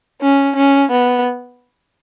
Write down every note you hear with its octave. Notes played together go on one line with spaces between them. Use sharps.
C#4
C#4
B3